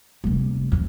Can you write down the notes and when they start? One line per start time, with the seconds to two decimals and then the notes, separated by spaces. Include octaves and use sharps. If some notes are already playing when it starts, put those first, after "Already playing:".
0.24 F1 G3
0.72 A1 F2